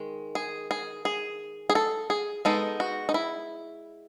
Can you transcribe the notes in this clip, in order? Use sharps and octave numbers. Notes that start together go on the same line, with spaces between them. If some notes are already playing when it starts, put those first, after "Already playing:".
Already playing: D#3 G#3
G#4
G#4
G#4
G#4
A4
G#4
G#3 B3 D#4 A4
F#4
D#4
E4